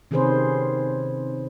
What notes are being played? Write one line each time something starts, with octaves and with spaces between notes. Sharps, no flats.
C3 D#3 C#4 G#4 B4 C5